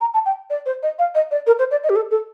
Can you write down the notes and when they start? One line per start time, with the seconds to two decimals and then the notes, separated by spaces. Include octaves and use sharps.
0.01 A#5
0.14 A5
0.26 G5
0.50 D5
0.66 C5
0.83 D#5
0.99 F5
1.15 D#5
1.31 D5
1.47 A#4
1.59 C5
1.71 D5
1.84 D#5
1.89 G4
1.96 A4
2.11 A4